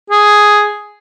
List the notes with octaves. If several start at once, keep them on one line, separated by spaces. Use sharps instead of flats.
G#4